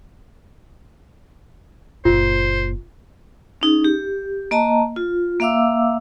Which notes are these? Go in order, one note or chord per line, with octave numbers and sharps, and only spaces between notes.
F#1 A#2 F4 C5
C#4 D#4 G#4
G4
A#3 D#5 A5 A#5
F4
A#3 E5 F5 D6 E6